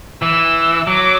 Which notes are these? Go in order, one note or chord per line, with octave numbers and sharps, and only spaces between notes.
E3 E6
F#3 D6